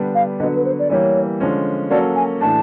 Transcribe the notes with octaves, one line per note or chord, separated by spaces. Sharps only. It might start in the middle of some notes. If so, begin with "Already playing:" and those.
Already playing: D3 G3 B3 D4
F5
D3 F#3 B3 D#5
B4
C5
D5
E3 G3 A#3 C#5 D5
D3 F3 G#3 C#4
F#3 A#3 C#4 F#4 A4 D5
G#5
A2 E3 A3 D4 A5